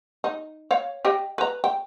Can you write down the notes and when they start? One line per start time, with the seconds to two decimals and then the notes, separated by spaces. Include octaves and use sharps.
0.24 D#4
0.71 C#5 F5
1.05 G4 D#5 G5
1.38 B4 A#5
1.64 G5